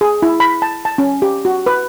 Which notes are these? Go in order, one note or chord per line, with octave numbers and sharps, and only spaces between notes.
G#4
E4
B5
A5
A5
C#4
G4
F#4
B4